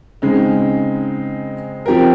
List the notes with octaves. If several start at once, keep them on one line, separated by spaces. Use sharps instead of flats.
C#3 G#3 C4 D#4
F3 C4 G4 A#4